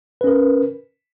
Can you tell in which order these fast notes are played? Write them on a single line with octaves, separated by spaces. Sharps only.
B4 C#4 A#4